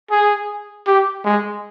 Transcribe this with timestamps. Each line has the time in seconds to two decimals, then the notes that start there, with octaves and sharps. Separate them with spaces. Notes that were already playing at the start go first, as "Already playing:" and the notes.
0.11 G#4
0.87 G4
1.25 G#3